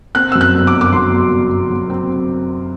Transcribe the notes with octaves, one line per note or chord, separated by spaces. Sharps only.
C4 F#6
F#2 E6
F#6
G1
D6
G1
D6
F#3 C6
G1
G1
G1
F#3
C4